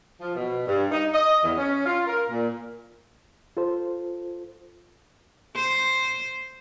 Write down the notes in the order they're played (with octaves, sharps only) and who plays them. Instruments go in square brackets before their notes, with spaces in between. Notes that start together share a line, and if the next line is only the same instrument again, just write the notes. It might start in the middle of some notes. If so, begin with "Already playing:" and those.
[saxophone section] F3
B2
G2
D#4
D#5
E2
C#4
F4
A#4
A#2
[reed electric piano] F4 A4 C5
[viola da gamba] C5